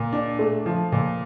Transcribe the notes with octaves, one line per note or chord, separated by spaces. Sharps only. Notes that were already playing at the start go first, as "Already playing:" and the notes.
Already playing: A#2
D4
A3
F3
A#2